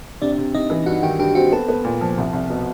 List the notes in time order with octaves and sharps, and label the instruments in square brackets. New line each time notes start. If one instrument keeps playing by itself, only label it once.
[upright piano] C3 [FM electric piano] D4 D5
[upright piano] C3
[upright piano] C3 [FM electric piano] D#4 D#5
[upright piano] E3
[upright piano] G2 [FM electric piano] F#4 F#5
[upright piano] D#3 [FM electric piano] G4 G5
[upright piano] G2 [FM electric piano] G4 G5
[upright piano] C4 [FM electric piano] F#4 F#5
[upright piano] B3 [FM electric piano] A4 A5
[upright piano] B3
A#2
F3
C2
C2
B2